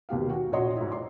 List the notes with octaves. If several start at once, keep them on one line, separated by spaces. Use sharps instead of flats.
D#2 B2 G4 F5
F#4 G5
A#1 F#4 C#5 D#5 C6
G#2 E4
D5 C6